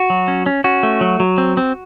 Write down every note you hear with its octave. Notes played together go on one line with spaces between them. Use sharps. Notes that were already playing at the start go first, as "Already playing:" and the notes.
Already playing: F#4
F#3
C#4
C#4
C#4 F#4
A3
F#3
F#3
C4
C4